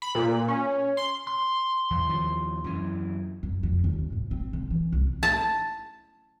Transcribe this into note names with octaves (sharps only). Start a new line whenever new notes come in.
B5
A#2
C#4
C6
C6
E2
D#2 F3
F#2 E3
F#2
F2
D#2
G#2
C4
D3
E3
C2
A5